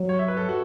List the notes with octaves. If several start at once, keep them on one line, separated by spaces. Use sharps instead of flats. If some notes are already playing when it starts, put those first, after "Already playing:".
Already playing: F#3
C#5
E5
B4
A4
F#4